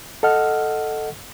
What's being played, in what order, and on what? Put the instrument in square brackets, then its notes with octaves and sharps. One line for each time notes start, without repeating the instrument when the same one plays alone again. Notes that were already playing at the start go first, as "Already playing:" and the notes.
[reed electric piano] A4 D#5 F#5 F6